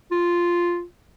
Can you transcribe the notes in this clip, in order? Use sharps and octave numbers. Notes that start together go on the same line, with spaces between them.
F4